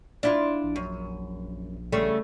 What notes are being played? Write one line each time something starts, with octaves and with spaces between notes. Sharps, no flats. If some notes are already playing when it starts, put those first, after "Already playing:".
D4 E4 F4
A#1
F#2
C#3 G3 A3